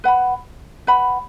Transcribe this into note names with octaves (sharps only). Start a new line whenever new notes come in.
B4 F#5 B5
B4 F#5 B5